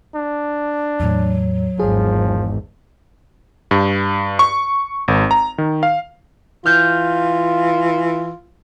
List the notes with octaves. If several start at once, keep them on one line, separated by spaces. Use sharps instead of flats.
D4
E2 A2 F#3
G#1 E2 F3 G#4
G2
C#6
G#1
A#5
D#3
F5
E3 F4 F6 G6